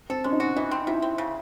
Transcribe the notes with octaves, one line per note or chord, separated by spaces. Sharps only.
C4 A4
G#3 C#4
D#4
C#4 F#4
E3 D#4
C4
C3 E4
C4
C#3